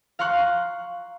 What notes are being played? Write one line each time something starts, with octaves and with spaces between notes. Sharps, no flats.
F5 A#5 C6 C#6 F#6